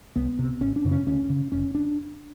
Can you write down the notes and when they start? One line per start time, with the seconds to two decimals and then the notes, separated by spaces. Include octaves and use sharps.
0.16 C2 B3
0.39 C3
0.61 G#1 C#4
0.76 D4
0.85 F#2 C#3
0.91 C#4
1.07 D2 C#4
1.30 C#3
1.52 F1 C#4
1.75 D4